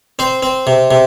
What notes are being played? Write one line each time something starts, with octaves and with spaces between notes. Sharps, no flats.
C4 C5
C4
C3
C3